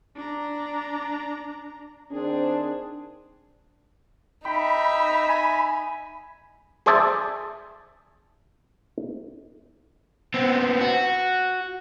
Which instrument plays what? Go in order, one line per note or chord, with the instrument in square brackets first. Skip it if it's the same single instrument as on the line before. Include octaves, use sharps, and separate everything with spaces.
[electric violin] D4 A#5
[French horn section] D#3 C4 D4 [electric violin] G#4
[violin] D#4 E5 [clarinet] G5 [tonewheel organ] B5
[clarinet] G#5
[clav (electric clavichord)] G#4 C5 D5 E5 A5
[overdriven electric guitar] B3 C4
F#4